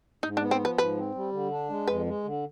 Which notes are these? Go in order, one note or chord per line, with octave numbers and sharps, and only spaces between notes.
G#2 D#4
D4
B3
C4
F3
B4
G#2 B4
C4
G3
D3
D4
G#3
F2 B4
G#3
D3